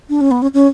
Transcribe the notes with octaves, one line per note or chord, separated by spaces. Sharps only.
D4
C#4
B3
C#4
C#4